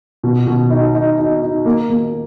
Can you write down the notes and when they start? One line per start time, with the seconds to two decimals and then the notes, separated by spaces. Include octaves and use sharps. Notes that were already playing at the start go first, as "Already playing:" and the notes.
0.23 B2
0.47 B2
0.70 D#4
0.95 D#4
1.18 D#4
1.42 D#4
1.65 A#3
1.90 A#3